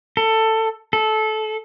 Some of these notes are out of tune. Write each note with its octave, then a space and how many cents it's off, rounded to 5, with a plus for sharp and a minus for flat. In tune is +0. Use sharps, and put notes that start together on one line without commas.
A4 +15
A4 -20